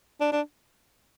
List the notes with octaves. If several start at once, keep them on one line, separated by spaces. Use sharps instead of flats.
D4
D4